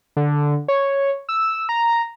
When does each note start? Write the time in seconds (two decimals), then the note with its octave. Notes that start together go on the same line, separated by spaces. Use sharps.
0.17 D3
0.68 C#5
1.29 E6
1.69 A#5